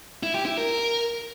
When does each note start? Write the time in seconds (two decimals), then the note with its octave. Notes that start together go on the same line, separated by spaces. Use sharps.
0.23 E4
0.35 G4
0.46 E4
0.58 A#4